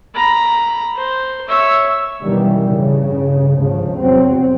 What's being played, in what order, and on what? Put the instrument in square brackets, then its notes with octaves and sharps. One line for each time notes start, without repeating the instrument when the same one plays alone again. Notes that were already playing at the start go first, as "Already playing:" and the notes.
[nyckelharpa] A#5 B5
C5
C#5 E5
[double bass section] F#2 B2 D#3 E3 G3
A1 G2 C#3
G#1 D2 G#2 C#3 F3
F1 E2 F#3 C4